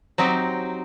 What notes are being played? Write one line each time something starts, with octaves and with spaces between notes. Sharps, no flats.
F#3 C4 D#4 G4